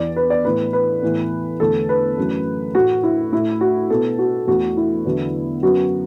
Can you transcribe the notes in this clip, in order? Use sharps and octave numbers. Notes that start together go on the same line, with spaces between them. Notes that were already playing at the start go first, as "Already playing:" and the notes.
Already playing: E2 E3 B3 D5
B4
D5
A2 E3 B3 B4
B4
A2 E3 B3
E2 D3 A3 A4
B4
F#2 E3 A3
A2 A3 F#4
E4
A2 A3 E4
F#4
B2 B3 A4
F#4
E2 E3 A3 F#4
E4
E2 D3 F#3 B3
F#2 F#3 B3 F#4